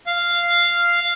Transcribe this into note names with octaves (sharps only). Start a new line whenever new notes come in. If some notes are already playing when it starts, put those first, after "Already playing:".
F5